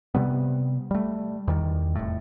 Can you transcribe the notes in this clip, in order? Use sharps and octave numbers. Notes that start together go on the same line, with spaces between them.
C3 G3 B3
G3 A3
E2 D#3 G3
F1 A2